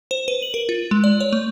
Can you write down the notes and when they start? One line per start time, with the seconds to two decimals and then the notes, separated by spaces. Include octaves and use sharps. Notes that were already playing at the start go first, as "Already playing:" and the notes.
0.11 C5
0.28 B4
0.42 F#7
0.54 A#4
0.69 F4
0.91 G#3
1.04 D5
1.21 C#5
1.33 A3